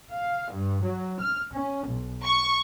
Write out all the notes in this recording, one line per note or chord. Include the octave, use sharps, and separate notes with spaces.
F5
G2
F#3
F6
C#4
B1
C#6